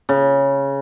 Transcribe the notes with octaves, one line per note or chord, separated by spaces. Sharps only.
C#3